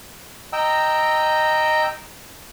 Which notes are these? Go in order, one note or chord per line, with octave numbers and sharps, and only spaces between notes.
D#5 G5 A#5 E6